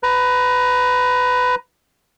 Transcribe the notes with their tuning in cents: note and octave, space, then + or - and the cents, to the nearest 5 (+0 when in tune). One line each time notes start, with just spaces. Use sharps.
B4 +20 A#5 +15